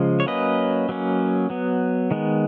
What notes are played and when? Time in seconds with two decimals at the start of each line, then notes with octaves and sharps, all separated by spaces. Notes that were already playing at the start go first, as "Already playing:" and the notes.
Already playing: C#3 F3 G#3
0.20 C#5
0.26 F#3 A#3 C#4 B4 D#5
0.89 F#3 A#3 C#4
1.50 F#3 B3
2.11 D#3 G#3 B3